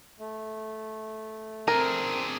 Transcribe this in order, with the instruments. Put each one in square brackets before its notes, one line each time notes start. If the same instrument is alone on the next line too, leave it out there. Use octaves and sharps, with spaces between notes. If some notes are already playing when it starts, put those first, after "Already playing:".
[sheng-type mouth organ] A3
[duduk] C4 [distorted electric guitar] D4 G#4 [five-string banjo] A#4